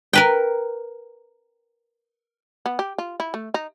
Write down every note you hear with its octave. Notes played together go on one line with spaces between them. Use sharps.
A#4 B4 G5
B3
G4
F4
E4
A3
D#4